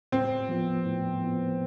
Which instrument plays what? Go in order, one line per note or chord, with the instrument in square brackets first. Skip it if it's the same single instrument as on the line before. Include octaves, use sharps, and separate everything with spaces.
[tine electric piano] A2 [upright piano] C4
[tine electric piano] F3 B3 F4
A2
F3 B3 F4